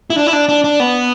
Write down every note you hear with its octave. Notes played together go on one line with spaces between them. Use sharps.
E4
D4
E4
D4
D4
D4
B3